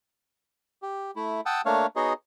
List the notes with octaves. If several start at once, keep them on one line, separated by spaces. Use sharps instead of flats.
G4
A3 E4
F#5 G5 A5 D#6 E6
A3 A#3 D4 C#5 F5
B3 D#4 F#4 G#4 C#5 D#5